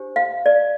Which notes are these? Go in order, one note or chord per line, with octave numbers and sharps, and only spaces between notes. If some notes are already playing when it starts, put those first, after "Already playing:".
Already playing: D4 G4 C5
F5
D5